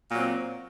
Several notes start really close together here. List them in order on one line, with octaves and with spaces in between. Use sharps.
A#2 F#3 C4